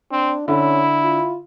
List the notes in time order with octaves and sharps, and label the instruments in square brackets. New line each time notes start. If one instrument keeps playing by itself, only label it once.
[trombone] C4 [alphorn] D4
[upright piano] D3 [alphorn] C#4 [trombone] E4
[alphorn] F4